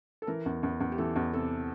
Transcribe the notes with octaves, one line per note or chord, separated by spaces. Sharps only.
A4
E3 A#4
E2
E2
E2
G4
E3 A4
E2
C3 A4